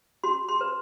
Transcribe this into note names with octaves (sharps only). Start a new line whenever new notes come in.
F#4 C6
C6
B4